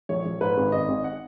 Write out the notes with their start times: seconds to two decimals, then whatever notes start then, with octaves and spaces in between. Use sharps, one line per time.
0.09 A#1 C#5
0.26 A#1
0.41 G#2 B4
0.57 G#1
0.72 G#1 D#5
0.88 G#1
1.04 F#5